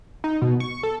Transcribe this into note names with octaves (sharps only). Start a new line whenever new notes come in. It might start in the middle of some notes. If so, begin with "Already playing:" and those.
D#4
B2
C#6
A4